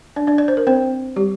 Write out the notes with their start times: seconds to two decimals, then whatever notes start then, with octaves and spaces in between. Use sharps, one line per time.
0.16 D4 D5
0.27 D4 D5
0.38 D5
0.48 C5
0.57 A#4
0.67 C4 C5
1.16 G3 G4